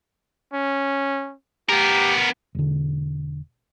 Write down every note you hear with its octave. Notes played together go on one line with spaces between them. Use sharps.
C#4
B3 G4 A#4
E1 D3